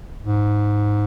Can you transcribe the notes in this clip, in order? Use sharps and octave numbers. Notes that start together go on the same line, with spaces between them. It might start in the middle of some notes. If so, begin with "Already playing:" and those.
G#2